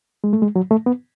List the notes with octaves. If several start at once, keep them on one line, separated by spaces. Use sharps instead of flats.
G#3
A3
G#3
F#3
A3
B3